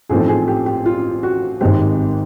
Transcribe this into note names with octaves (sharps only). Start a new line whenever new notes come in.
A1 G#2 F3 A3 C4 G#4
G#4
G4
G4
F4
F#4
G#1 G#2 D#3 G#3 C4 G4